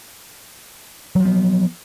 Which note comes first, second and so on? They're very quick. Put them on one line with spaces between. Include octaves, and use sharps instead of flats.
F#3 F3 B3